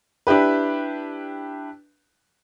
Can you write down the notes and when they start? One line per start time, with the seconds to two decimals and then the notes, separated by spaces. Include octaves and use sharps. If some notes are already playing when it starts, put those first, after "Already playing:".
0.27 D4 E4 G4 B4